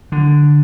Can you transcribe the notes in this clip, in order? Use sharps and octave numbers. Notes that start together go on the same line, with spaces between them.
D3